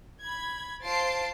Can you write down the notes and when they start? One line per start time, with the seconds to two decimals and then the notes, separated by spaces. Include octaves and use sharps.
0.23 B5 G#6
0.83 F4 C5 A5 A6 C7 D7